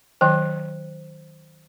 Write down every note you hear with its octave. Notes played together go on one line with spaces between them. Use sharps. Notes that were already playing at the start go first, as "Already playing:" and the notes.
D#3 F#3 C5 G5